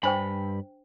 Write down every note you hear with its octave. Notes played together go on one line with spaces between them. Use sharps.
G2 D4 C5 G5 B5